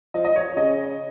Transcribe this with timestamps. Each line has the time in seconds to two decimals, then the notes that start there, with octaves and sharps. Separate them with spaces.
0.14 F3 D#5
0.25 D#5
0.36 C#5
0.56 C#3 D#5